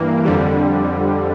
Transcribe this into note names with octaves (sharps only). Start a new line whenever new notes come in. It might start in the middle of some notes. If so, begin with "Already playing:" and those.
Already playing: G2 E3 A#3
F2 D3 G3